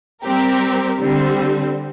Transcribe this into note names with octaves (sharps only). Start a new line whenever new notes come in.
G3 C4 G4 A#4
D3 G3 C4